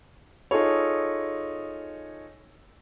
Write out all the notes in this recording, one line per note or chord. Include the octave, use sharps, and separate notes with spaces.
D#4 F4 G#4 A4 C#5